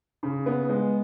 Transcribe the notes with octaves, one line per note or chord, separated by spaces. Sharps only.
C#3
B3
G#3